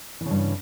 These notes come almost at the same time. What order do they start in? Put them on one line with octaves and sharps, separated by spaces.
E3 C#3 G2 C#4